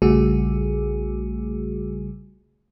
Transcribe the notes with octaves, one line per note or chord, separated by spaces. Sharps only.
A#1 C#3 G3 A3 F#4 G#4